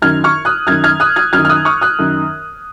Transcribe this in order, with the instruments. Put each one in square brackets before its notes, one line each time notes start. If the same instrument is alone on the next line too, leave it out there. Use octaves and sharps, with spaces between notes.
[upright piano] F#2 D#3 F6 G#6
C#6 F6
D#6 F#6
F#2 D#3 F6 G#6
F6 G#6
D#6 F#6
F6 G#6
F#2 F6 G#6
D#3
F6
D#6 F#6
C#6 F6
D#6 F#6
F#2 D#3